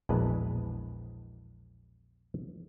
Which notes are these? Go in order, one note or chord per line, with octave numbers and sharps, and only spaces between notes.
A#1 E2 B2 G#3 B4 A5